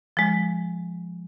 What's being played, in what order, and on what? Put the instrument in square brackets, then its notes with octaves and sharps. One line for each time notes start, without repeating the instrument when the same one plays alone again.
[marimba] F3 G#3